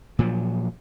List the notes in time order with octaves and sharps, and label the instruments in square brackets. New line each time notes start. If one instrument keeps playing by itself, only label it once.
[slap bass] A#2 F3 F#3